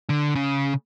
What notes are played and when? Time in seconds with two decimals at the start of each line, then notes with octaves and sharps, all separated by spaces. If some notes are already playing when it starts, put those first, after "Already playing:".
0.09 D3
0.35 C#3